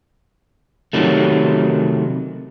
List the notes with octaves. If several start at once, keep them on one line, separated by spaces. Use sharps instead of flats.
C3 D#3 F#3 A3